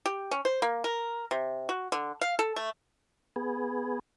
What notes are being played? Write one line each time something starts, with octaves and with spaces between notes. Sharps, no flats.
G4
C#4
C5
A#3
A#4
C3
F#4
D3
F5
A4
A3
B3 G#4